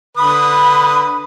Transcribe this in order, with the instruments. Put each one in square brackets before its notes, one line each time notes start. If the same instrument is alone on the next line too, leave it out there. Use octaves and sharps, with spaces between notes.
[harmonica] D3 B4 D#6 [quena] B5